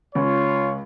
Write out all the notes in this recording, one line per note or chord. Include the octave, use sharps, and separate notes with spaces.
C#2 F4 C#5